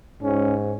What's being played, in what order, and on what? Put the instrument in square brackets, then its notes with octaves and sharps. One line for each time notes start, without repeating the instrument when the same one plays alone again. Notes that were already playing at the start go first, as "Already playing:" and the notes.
[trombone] G#2 [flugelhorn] C#4